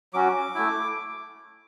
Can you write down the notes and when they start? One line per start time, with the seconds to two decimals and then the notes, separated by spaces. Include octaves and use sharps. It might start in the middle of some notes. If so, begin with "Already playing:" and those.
0.14 F#3 C#4 F#4 D6
0.55 A3 E4